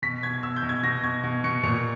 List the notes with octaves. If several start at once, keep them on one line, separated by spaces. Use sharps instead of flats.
B2 B6
B2 G#6
B2 E6
G6
B2
G#6
B2 A#6
B2 G#6
B2
B2 C#7
A#2 C#7